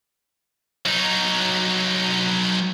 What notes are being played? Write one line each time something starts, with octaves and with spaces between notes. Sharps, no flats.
F#3 D#4